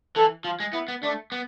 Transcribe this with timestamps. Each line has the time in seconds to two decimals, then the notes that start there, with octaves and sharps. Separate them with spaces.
0.16 E3 A4
0.45 F3 F4
0.60 G#3
0.73 B3 E4
0.88 B3
1.03 A3 D4
1.32 B3